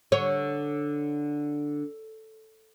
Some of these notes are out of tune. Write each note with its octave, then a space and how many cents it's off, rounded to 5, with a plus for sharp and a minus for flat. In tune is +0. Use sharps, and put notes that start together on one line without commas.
D3 +0 C#5 +0